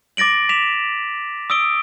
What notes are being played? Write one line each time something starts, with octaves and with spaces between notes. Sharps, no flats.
D6 A6 A#6 D7 F#7
D6 B6 E7 F7
D#6 E6 D7 G7